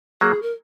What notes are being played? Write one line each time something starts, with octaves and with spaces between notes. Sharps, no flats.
F#3 A#3 G#4
A#4